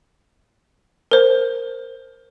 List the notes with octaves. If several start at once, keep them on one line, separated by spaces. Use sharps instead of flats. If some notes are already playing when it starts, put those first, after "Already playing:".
A#4 C5